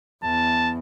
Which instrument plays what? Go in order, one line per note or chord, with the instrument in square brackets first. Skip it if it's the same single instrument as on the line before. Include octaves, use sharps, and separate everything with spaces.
[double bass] E2 [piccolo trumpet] A5